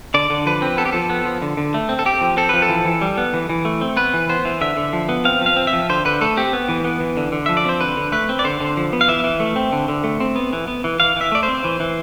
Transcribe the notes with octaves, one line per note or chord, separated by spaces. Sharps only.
D3 D5
D3
F3 B4
C4
B3 A4
G4
F3 A4
B3
F3
D3
D3
A3
C4
A4
C4 G4
F3
C4 A4
F3 B4
A4
E3
E3
G3
B3
E3
E3
A3
C4
B3 B4
E3
B3 C5
E3
D3 E5
D3
F3
B3
C4 F5
F3 F5
C4
E5
F3
D3 C5
D3 B4
A3 A4
C4 G4
B3
E3
B3
E3
D3
D3
F3 E5
D5
C4 C5
D3 B4
D3
A3 B4
C4
D5
D3 C5
D3
F3
B3
F5
E3 E5
E3
A3
C4
D3
D3
A3
C4
B3
E3
B3
E3
E3 F5
E3 E5
A3 D5
C5
C4
E3
E3